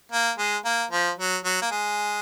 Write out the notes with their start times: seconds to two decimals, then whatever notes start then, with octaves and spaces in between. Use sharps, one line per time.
0.12 A#3
0.38 G#3
0.65 A#3
0.91 F3
1.18 F#3
1.45 F#3
1.62 A#3
1.71 G#3